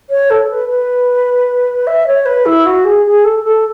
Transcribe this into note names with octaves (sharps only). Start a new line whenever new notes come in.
C#5
A4
B4
B4
E5
C#5
B4
E4
F#4
G#4
G#4
A4
A4